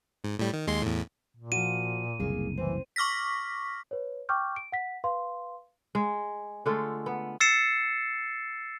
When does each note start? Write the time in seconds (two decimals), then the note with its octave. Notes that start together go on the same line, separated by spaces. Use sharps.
0.24 G#2
0.39 A2 G3
0.53 D#3
0.67 D#2 G#3 C6
0.82 E2 A2
1.37 A#2
1.52 F3 F#4 D#7
2.20 F#1 C2 A#3 G#4
2.58 E3 C4
2.96 C#6 D6 F6 A#6 B6
3.91 B4 C#5
4.29 G5 C#6 D6 F6 G6
4.56 D7
4.72 F#5 B6
5.04 B4 F5 C6
5.95 G#3
6.66 D3 G#3 A3 F4
7.06 B3
7.40 E6 A6 C7 C#7 E7